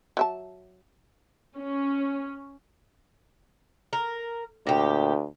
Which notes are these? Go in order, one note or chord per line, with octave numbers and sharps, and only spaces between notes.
F#3 E5 A5
C#4
A#4
D2 A#2 G4